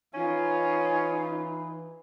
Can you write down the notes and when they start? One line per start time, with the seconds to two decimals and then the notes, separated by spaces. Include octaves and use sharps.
0.14 E3 C#4 D#4 F4